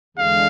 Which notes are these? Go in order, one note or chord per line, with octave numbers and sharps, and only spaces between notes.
E2 D3 G#3 F5